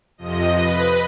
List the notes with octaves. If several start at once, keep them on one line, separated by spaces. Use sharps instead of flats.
F2 C3 F3 D#5
B4